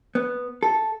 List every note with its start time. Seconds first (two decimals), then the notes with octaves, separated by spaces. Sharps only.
0.15 B3
0.63 A4